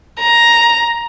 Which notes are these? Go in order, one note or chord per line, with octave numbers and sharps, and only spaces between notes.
A#5